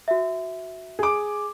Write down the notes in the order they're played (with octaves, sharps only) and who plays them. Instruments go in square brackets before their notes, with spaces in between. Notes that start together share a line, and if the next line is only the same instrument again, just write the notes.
[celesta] F#4 E5
[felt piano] G#4 D6